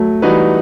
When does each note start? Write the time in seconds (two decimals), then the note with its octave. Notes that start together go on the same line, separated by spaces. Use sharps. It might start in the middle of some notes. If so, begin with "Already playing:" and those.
Already playing: F#3 A3
0.22 E3 G3 D#4 F#4 B4